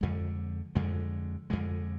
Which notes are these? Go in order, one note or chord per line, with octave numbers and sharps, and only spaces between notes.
F2 D3 G#3
F2 D3 G#3
F2 D3 G#3